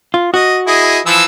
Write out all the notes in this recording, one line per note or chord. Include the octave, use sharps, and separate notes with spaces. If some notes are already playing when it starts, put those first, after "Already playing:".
F4
F#4 D#5
E4 G#4 D#5
E3 F3 E6